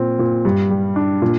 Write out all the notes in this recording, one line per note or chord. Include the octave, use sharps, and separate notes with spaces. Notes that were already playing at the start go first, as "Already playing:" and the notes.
Already playing: A#2 C4
A#2
G2
G3
D4
A#2